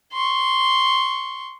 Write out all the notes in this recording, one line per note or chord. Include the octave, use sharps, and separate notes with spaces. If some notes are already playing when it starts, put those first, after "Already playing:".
C6 C#6